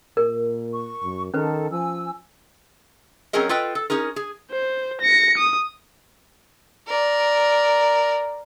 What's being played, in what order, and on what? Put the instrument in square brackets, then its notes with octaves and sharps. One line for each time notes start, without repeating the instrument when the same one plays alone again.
[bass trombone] A#2 [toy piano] A#4
[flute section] C#6
[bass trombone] F#2
[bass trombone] D#3 [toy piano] C#4 B4 [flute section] A4
[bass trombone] F3 [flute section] G#5 E6
[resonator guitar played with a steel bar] F#3 C4 C#4 G#4 A#4 D#5
F4 A4 B4 D#5 G5
A4
C#4 D#4 G#4 A#4
G#4
[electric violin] C5
A#6 C#7
D#6
[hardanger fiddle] A#4 D5